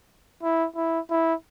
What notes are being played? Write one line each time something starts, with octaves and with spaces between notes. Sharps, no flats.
E4
E4
E4